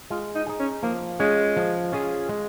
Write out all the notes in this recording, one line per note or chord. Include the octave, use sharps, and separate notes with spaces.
G#3 F4
D#4
D#4 G#4
C#4
F3 A#3
G#3 C#4 F4 G#4
F3
C#4 F4 G#4
G#3